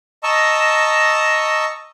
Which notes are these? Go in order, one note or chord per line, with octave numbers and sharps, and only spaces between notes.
D#5 A5 A#5 C#6 E6